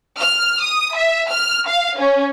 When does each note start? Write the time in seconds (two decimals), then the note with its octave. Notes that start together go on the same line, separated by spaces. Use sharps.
0.19 F6
0.62 D#6
0.95 E5
1.30 F6
1.67 F5
1.99 C#4